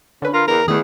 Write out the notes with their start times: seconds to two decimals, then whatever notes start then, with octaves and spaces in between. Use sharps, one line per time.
0.22 D3 C#4 B4
0.34 F4 A#4
0.48 E2 A#4
0.68 E2 D#3 A3 G#4